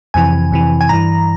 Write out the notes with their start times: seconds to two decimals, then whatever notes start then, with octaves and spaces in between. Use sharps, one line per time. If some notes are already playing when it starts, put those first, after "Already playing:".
0.14 F2 C3 E3 G#5
0.52 F2 C3 E3
0.81 G#5
0.89 G2 E3 A#5